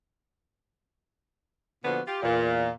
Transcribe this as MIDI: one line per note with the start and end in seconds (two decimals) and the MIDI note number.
1.84 1.99 46
1.84 1.99 50
1.84 1.99 53
1.84 1.99 59
1.84 1.99 66
2.07 2.19 65
2.07 2.19 67
2.22 2.71 40
2.22 2.71 46